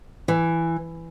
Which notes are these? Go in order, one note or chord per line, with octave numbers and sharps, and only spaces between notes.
E3